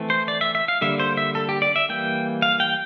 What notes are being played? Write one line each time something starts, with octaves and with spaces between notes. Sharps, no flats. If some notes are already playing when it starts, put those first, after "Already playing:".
Already playing: E3 A3 C4
C5
D5
E5
E5
F5
D3 G3 A#3 E5
C5
E5
A4
G4
D5
E5
E3 G3 A#3 G5
F5
G5